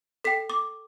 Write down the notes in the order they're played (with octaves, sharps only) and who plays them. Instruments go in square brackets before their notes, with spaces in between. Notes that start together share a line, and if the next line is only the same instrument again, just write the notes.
[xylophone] A4 G5 B6
D6